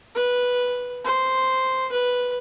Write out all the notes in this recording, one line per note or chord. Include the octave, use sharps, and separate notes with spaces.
B4
C5
B4